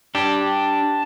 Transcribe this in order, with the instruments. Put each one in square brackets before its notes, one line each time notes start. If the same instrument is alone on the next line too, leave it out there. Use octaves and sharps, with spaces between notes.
[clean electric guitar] D4 G4 [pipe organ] A5